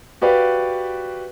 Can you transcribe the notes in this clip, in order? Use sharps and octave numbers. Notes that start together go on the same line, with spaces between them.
F#4 G4 B4 D5 F5